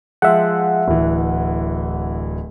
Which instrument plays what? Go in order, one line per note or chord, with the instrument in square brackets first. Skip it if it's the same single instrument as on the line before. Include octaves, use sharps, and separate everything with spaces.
[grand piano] F3 G#3 [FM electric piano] E5 F#5
[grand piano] D1 E3